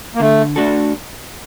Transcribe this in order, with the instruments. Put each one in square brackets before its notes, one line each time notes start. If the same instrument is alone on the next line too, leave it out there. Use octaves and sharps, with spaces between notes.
[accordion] A#3
[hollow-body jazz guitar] D3 [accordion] A3
[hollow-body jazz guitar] A3 D4 F#4 A4